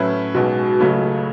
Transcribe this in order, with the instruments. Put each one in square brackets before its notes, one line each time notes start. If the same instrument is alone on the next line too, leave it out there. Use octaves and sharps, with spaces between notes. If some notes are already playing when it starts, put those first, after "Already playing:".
Already playing: [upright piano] A2 F#3 C#4 E4 B4
[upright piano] B1 B2 G#3 [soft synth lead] F#4
[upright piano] C#2 C#3 F#3 A3 C#4